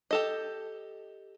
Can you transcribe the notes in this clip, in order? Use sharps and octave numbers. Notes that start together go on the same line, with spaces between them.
G4 A4 D#5